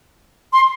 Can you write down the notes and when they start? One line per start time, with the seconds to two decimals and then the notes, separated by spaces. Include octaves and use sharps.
0.53 C6